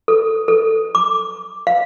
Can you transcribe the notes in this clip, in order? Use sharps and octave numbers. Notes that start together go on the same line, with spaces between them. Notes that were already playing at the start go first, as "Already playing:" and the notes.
A4
A4
D6
F5